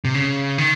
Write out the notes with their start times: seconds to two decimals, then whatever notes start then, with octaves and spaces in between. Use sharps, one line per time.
0.05 C3
0.15 C#3
0.58 D#3